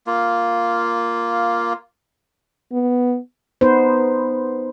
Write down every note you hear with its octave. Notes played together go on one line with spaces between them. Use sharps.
A#3 F4
B3
B3 D#4 B4 C5